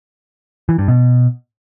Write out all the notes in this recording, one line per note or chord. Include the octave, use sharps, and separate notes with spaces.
E3
G2
B2